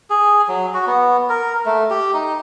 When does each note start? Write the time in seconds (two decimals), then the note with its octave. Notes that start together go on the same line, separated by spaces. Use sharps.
0.10 G#4
0.48 F#3
0.74 F#4
0.87 B3
1.30 A#4
1.66 A3
1.90 G4
2.14 D#4